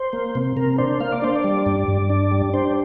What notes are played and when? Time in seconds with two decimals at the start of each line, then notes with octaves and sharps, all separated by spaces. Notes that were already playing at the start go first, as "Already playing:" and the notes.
Already playing: C5
0.13 A#3
0.35 C3
0.56 C3 A#4
0.78 D4 C5
1.00 A#3 F5
1.12 D5
1.22 D4 C5
1.36 D5
1.44 G3
1.66 G2
1.88 G2
2.10 D4
2.31 G3
2.54 D4 C5